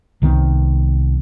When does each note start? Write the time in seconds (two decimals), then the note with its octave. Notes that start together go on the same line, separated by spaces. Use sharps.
0.22 C2 D#3 F3 B3